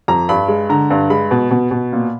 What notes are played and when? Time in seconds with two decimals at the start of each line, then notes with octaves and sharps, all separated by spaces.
0.08 F2 A#5
0.29 G2 B5
0.48 G#3
0.69 D3 A#5
0.90 G2
1.10 G#3 B5
1.31 B2
1.51 B2
1.71 B2
1.93 A#2